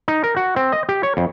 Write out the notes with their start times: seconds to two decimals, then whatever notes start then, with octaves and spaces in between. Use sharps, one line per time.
0.08 D#4
0.24 A#4
0.36 F#4
0.56 C4
0.72 D#5
0.89 G4
1.03 C#5
1.17 F2